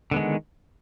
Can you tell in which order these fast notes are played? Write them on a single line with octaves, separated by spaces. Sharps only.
D3 B3 G#3 D#3